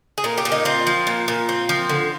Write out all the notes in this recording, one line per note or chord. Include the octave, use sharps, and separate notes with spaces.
G#4
A#2 A#4
G4
A#2
D#4
C4 F4
F3
A#2
A#2
C4
F3
D3